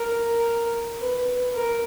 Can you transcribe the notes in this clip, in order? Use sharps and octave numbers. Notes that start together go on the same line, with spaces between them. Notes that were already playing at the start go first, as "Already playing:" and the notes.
Already playing: A#4
B4
A#4